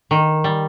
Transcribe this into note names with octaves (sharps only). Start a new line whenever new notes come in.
D#3
G3